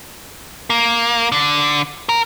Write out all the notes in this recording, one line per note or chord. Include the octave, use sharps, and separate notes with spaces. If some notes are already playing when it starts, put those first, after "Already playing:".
A#3
D3
A#4